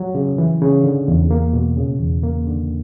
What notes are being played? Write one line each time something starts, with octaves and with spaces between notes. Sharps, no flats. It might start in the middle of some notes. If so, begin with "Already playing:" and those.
Already playing: F#3
C#3
E3
C#3
D3
E2
A#3
B2
C#3
E2
A#3
D3